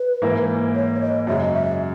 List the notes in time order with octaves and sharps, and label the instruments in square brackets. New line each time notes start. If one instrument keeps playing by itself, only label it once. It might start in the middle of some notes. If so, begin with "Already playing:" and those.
Already playing: [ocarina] B4
[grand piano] G#2 E3 A#3 E4 A#4
[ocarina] C#5
C#5
D#5
[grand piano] F#2 C#3 G#3 [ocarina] E5
[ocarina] D#5
E5